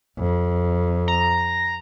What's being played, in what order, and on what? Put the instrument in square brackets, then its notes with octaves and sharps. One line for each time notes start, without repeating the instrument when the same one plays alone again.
[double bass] F2
[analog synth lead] A#5